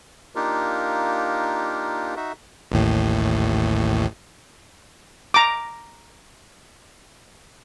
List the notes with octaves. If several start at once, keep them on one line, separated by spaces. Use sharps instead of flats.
A#3 D4 D#4 F4 G4 A#4
D#4 F#4 E5
A1 D#2 A2
A#5 D6